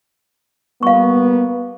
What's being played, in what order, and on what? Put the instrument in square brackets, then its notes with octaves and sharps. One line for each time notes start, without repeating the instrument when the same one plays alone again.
[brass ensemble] G3 A#3 B3 [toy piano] F5 C#6